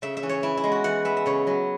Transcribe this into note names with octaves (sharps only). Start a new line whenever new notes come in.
C#3 E5
E5
E3 C#4
C#5
E3 E4
E4
G#3 B3
F#4
E3 F#5
B3 E5
E5
C#3 C#5
F#3 B3